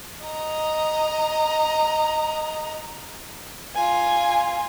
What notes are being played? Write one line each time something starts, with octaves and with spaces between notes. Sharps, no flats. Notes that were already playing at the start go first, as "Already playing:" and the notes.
D#5 A#5
F4 G#5